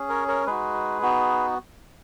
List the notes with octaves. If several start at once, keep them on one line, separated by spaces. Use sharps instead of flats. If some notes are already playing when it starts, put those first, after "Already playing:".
Already playing: C#4 G#4
A#4 C#5
A#4 C#5
G#3 D#4 F#4 G#4 B4
B3 D#4 F#4